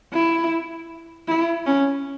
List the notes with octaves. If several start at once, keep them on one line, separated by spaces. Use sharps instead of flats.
E4
E4
C#4